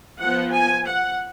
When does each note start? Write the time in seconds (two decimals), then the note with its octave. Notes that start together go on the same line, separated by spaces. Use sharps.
0.20 F3 B3 F#5
0.53 G#5
0.88 F#5